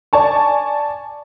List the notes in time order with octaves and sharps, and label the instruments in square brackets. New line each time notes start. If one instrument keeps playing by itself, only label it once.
[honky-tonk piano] D5 G#5 A5 C#6